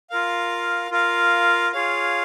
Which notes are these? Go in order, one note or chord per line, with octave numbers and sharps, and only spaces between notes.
F4 A#4 F5
F4 A#4 F5
F4 G#4 C#5 F5